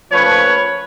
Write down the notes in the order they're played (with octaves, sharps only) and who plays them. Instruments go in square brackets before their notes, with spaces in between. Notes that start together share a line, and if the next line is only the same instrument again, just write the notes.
[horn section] A#2 F3 A3 C#4 B4 C#5